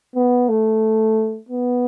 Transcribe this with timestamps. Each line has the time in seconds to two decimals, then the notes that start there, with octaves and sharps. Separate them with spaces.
0.16 B3
0.49 A3
1.49 B3